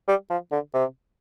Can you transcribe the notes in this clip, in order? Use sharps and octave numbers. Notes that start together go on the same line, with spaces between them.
G3
F3
D3
C3